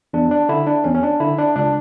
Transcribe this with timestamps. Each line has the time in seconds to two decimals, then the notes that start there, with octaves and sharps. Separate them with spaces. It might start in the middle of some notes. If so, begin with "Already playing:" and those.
0.13 E2 D4
0.31 D4
0.49 D3 E4
0.67 D4
0.84 E2 C#4
0.94 C#4
1.03 D4
1.20 D3 E4
1.38 D4
1.56 C#2 D4